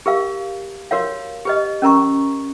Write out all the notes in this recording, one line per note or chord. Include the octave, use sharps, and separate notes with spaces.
G4 A#4 F5
F#4 A#4 C#5 F5
G4 B4 D#5
C#4 A#4 A#5 C#6